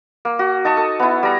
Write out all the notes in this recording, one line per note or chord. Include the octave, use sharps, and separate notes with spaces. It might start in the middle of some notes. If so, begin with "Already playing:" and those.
A#3
F#4
D#4 A5 C#6 D#6
A4
B3 E4
G3 A#5